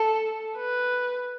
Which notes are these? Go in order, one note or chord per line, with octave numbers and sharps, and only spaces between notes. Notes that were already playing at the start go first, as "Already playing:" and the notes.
Already playing: A4
B4